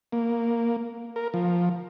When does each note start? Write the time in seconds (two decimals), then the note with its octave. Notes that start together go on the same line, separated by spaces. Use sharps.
0.12 A#3
1.16 A#4
1.34 F3